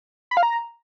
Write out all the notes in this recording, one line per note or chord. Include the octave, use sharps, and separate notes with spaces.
B5
F5
A#5